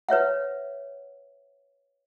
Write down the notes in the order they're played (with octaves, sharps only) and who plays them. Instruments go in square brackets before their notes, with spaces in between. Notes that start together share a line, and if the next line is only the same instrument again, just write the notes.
[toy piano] B4 C#5 E5 F#5